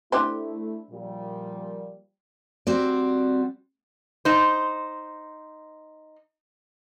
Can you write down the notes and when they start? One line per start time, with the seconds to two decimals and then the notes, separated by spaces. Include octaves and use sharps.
0.12 A3 D4 E4 G4 C5
0.91 A#2 F3 G3
2.67 G3 C4 F#4 D5
4.25 D#4 C5